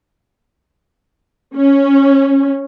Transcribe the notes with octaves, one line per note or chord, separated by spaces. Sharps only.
C#4